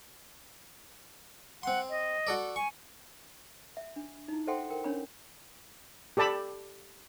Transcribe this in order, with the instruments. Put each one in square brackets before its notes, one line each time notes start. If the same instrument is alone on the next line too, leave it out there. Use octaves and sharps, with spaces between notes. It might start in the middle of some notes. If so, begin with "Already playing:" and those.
[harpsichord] C4 C6 [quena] F#5
[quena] D#5
[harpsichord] F#4 A4 D5
[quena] G#5 [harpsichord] C#6
[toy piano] E5
D4
D#4 E4
A4 C5 E5 F#5 G5 C6
A#4 G5
C#4 D4 C#5 B5
[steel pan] G4 A4 D5 A5 B5